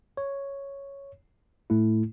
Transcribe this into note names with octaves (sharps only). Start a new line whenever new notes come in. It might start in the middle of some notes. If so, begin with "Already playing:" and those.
C#5
A2 A3 E4